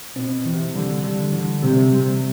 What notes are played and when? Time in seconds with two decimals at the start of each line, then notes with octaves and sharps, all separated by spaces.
0.16 B2 C4
0.45 C3 E3
0.74 D3 G3
1.04 D3 G3
1.32 D3 E3
1.62 C3 G3
1.91 C3 G3